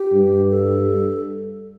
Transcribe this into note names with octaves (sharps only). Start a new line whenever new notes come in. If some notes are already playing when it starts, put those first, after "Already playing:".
Already playing: G4
G2
A4